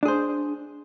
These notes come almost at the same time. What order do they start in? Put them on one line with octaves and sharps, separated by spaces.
D4 G#4 C5